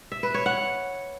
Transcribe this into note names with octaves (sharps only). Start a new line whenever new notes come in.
E5
B4
C#5
F#5